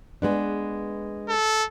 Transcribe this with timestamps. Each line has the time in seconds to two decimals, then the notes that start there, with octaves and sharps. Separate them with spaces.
0.22 G#3 B3 D4
1.29 A4